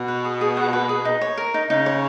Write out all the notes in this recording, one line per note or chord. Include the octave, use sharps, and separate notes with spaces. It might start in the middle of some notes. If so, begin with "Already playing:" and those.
Already playing: B2
B4
G#4
G#4
F#5
B4
G#4
D#4
C#5
A#4
D#4
C#3 D#4
C#5